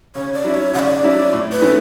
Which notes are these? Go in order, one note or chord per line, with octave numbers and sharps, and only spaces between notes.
C#3 C#5
D5
F#3 C#4 E4
C#5
C#3 F#5
D5
F#3 C#4 E4
A2
B4
E3 A3 C#4